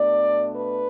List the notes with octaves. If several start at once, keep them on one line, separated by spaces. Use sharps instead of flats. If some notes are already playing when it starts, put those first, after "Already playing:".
Already playing: B2 A3 D4 D5
B4